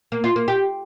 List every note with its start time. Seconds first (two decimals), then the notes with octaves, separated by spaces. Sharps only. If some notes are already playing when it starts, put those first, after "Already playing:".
0.12 A#3
0.24 F4
0.36 A#3
0.48 G4